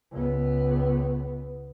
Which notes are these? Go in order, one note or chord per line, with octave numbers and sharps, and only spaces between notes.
C#2 B3